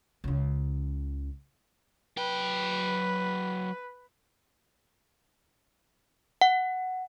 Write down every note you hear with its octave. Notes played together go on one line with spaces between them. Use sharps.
C#2 C#3
F#3 B4 G5
F#5